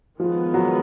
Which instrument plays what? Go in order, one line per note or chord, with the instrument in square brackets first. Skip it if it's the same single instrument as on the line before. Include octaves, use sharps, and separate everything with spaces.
[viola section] D#3 G#3 B3 [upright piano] F3
[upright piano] F#3